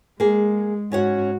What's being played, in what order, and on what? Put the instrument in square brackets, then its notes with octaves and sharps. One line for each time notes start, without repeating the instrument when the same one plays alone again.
[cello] G#3 [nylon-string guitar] A#3 G#4
[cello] G#2 F#4 [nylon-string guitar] C#4 C#5 F#5